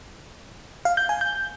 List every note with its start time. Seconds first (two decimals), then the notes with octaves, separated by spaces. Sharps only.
0.85 F5
0.97 G6
1.09 G#5
1.21 G6